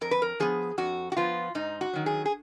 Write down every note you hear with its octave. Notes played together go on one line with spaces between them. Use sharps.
F2 A#4
B4
A#4
F3 B3 G#4
F2 F#4
F#4
F3 B3 F4
G#2 D#4
F#4
D#3 F#3
G#4
G#4